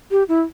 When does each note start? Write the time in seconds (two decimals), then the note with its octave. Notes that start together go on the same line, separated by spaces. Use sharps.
0.11 G4
0.29 E4